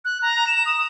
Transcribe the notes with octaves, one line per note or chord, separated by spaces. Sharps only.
F#6
A#5
E7
D#6